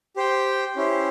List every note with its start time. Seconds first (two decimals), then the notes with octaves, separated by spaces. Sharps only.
0.16 G4 C5 G5
0.76 C#4 E4 G4 C5